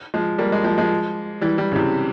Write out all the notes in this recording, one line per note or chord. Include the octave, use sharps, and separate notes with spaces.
F3 G#3
G3 A#3
F3 G#3
F3 G#3
F3 G#3
E3 G3
E3 G3
C#3
C3 E3